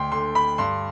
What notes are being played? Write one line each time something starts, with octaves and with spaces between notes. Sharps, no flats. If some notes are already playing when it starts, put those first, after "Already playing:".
Already playing: D2 G5 C6
D3 C6
B5
G2 C6